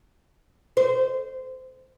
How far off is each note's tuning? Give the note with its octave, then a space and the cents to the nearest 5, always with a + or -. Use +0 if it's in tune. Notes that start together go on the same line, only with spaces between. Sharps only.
C5 -20